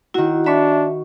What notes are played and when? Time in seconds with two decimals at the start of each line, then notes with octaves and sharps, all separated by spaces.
0.14 D#3 E4 F#4
0.46 D4 E5 B5 C#6